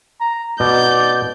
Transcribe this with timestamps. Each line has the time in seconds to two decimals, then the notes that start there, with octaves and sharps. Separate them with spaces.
0.21 A#5
0.60 B2 D5 G6